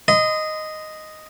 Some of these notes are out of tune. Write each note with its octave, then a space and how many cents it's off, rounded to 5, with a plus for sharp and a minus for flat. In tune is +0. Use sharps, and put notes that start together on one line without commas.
D#5 +0 C6 -40